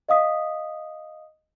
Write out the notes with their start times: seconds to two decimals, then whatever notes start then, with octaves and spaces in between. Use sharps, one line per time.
0.09 D#5 F5 D#6 B6